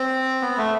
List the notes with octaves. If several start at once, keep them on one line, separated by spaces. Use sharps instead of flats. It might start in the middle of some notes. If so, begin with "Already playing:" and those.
Already playing: C4
B3
A3